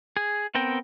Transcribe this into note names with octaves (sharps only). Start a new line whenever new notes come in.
G#4
B3 C4 A#4 G5